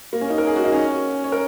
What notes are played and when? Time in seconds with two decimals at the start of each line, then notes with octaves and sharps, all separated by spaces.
0.13 A#3
0.21 C#4
0.30 D#4
0.38 A#4
0.47 G#4
0.56 F#4
0.64 D#4
0.72 C#4
1.24 C#5
1.32 A#4